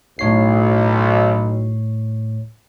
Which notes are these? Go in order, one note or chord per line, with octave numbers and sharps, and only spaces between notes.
B1 A2 C#5 C7